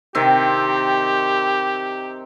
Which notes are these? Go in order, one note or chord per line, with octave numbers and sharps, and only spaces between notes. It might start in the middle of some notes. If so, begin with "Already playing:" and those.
C3 D#3 C4 G4